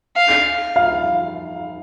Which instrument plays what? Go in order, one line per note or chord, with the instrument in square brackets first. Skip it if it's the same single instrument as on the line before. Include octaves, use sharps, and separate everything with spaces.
[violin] F5
[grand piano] F5